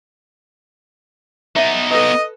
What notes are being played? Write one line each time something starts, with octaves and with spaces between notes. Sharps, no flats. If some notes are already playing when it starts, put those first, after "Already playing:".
B3 D#4 E5
A4 B4 D#5